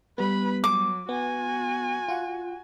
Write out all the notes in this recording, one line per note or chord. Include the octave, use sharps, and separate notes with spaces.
G3 B3 B4 B5
F#3 D6
B3 F#4 G#5
F4 F#5